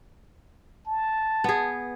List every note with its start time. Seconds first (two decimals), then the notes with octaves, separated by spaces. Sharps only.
0.87 A5
1.44 B3 G#4